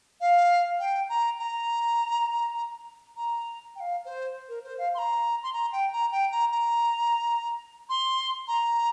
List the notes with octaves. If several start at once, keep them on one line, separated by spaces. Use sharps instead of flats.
F5
G5
A#5
A#5
A#5
G5
F5
C5
A#4
C5
F5
C6
A#5
C6
A#5
G5
A#5
G5
A#5
A#5
C6
A#5